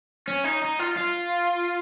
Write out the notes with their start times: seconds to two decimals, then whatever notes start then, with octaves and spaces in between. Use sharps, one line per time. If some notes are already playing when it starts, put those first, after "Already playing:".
0.28 C#4
0.44 D#4
0.62 D#4
0.80 F4
0.97 F4